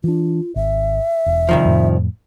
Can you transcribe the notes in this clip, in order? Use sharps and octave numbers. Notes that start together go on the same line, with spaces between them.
E3 D4 F4
G#1 E5
E1
C2 D#3 F3
F2 A2